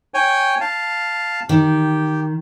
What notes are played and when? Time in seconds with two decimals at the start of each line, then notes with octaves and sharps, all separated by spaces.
0.14 C#5 G5 G#5
0.61 F5 A5
1.49 D#3 G4